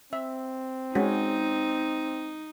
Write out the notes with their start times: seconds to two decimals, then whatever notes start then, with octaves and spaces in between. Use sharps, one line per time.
0.13 C4 E5
0.95 G#3 C#4 D#4 F#4